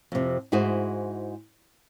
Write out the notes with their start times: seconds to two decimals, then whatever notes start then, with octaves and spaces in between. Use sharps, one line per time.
0.12 F2 C3
0.52 G#2 E4 F#4 G#4 C5